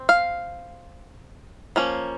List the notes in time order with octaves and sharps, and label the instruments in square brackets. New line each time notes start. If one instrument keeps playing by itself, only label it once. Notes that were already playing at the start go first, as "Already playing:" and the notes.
Already playing: [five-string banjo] C4
F5
F3 A#3 C#4